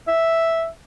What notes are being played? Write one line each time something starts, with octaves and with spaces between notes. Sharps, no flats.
E5